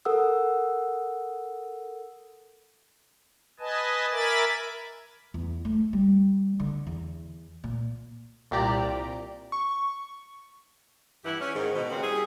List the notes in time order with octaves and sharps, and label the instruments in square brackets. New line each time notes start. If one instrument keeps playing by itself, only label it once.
[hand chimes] A4 A#4 F#5 D#6 E6
[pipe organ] B4 D#5 G#5 A5
A#4 E5 G#5 B5 D6 A6
[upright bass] E2
A3
G3
D3
E2
A#2
[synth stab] C2 A#2 G4 D5 A#5
C#6
[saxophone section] G2 E3 E4 G4 F#5
C#4
G#2 D#3
B2
C#3 A#3 C4 F4 F#4
G3 E4 G#4